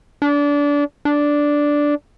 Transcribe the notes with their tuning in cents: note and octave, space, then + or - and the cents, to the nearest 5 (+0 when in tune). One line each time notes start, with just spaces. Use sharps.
D4 -25
D4 -5